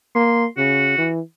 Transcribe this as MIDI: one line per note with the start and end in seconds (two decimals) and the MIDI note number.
0.15 0.46 58
0.15 0.45 84
0.57 0.94 49
0.57 1.07 66
0.98 1.20 52